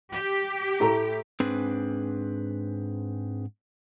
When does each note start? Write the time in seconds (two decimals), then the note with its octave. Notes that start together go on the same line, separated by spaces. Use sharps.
0.13 G4
0.80 A2 A3 A#5
1.40 G#2 C4 D4 G#4 B4